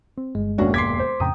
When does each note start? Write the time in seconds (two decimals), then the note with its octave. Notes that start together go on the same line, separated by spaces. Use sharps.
0.17 C4
0.35 G1 G#3
0.58 E1 D#2 C#4 D4 F#4
0.74 C6 D6 G#6 B6 C7
0.99 C5
1.20 F2 A2 C#3 G5 A#5 D#6